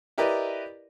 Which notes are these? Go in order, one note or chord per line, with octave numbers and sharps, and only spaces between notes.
E4 G4 A#4 B4 D5 D#5